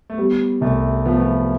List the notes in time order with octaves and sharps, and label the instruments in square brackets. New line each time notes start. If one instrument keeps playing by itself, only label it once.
[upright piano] A3
[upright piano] G3 [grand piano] B3
[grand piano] C2 [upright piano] A3
[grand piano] F3 [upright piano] B3
[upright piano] A3
B3